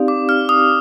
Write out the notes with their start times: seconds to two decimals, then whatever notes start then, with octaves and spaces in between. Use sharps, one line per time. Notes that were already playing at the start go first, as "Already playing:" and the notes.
Already playing: C4 D#4 G4 D5 F5
0.08 D6
0.29 F6
0.49 D#6